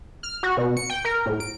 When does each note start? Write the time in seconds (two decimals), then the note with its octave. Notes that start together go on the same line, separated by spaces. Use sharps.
0.23 F6
0.43 F#4
0.57 B2
0.77 C#7
0.90 G5
1.05 A#4
1.26 A2
1.40 D7